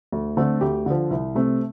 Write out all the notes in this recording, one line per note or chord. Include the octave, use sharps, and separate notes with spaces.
D2
D3 A3 C4
D2 G4
D3 F3
C2
C3 A3 C4